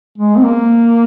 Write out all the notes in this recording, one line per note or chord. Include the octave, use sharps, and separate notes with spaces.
G#3
C4
A#3